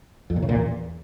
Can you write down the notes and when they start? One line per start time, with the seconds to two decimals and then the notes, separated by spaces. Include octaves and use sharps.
0.30 F2
0.36 A#2
0.42 C#3
0.49 A#2
0.55 E2